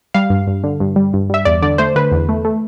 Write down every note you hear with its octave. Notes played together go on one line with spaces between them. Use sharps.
G3 F5
G2
G2
D3
G2
G3
G2
G3 E5
E2 D5
D3 D5
A3 C5
D3 B4
E2
A3
A3